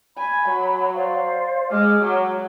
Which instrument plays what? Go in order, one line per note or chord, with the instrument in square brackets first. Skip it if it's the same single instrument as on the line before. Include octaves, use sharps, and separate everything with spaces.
[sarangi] G#5 [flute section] B5
[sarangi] F#3
[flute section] C5 D5 F5
[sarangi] G#3 [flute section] D6 D#6 F6
[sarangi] F#3